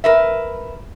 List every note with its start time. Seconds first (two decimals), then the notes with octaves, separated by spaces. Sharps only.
0.04 A#4 B4 E5